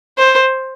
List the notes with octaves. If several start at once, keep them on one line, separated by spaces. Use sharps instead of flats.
C5